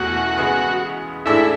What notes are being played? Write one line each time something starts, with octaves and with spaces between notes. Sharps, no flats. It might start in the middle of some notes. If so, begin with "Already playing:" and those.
Already playing: E2 B2 A3 C#4 F#4
C#3 G#3 B3
A2 G#3 D4 E4 A4 D5